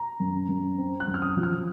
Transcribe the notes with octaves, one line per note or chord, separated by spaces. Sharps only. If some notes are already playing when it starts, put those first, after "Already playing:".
Already playing: A#5
F#2
F#2
C4
F#6
F#2
F6
D#6
F3
F6